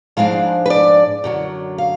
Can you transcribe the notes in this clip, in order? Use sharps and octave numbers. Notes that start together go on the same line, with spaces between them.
G#2 F3 G#3 D4 F5
B4
D5
F#2 D3 F#3
F5